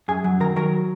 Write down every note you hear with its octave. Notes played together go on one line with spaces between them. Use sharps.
F#2 G#4 G#5
F#3
D#3 A#4 A#5
F#3 A#4 A#5